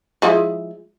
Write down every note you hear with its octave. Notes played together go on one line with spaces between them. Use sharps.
F3 G#3 E4